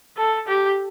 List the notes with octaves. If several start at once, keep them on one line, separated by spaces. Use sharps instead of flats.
A4
G4